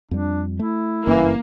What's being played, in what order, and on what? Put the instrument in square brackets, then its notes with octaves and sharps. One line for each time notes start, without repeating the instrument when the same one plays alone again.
[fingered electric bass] F2 G3 [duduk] D4
[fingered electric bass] A3 [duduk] E4
[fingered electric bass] F#1 G2 C#4 [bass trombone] E3 [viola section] A#3